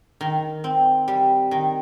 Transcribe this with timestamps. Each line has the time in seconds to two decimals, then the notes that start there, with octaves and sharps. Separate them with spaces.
0.21 D#3
0.64 C4
1.08 G3
1.51 D#3